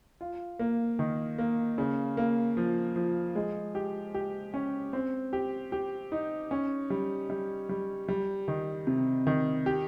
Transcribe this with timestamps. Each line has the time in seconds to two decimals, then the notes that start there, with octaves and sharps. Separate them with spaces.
0.21 F4
0.59 A#3
0.99 D#3
1.38 A#3
1.78 C#3
2.17 A#3
2.57 F3
2.96 F3
3.35 G#3
3.75 G4
4.14 G4
4.54 C#4
4.93 C4
5.33 G4
5.72 G4
6.12 D#4
6.51 C#4
6.90 G3
7.30 G3
7.69 G3
8.08 G3
8.48 D#3
8.87 C3
9.27 D#3
9.66 G4